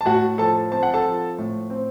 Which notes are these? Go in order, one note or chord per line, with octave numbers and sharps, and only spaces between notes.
A5
A2 F#4 F#5
F3 A4 A5
C4 A5
F#5
A4 A5
F3
A2
C4